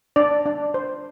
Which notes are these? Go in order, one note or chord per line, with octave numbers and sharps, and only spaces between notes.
D4 D5
D4
C5